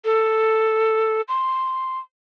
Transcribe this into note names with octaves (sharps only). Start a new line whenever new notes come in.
A4
C6